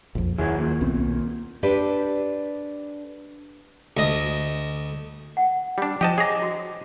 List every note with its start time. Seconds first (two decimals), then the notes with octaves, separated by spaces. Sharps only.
0.15 A#1 F2
0.38 D#2 F#3 E4 G#4
0.59 A#2 D#3
0.81 B1 B3 C4
1.63 D4 G4 A4 B4 C5 D5
3.97 D2 D#5
5.37 F#5
5.78 G3 D4
6.01 F3 G4 C5 D#5 G5 A5
6.18 G#4 C#5 D#5 A#5 D6
6.42 F#4